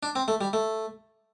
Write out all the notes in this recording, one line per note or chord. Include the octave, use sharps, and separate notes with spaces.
D4
C4
A3
G3
A3